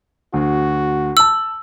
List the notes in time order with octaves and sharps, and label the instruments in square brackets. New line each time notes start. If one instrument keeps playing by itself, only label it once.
[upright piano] D2 [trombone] F#4
[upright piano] A5 F#7 [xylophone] E6